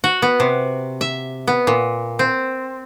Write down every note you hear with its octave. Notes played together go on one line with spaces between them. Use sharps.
F#4
B3
C3
E5
B3
A#2
C4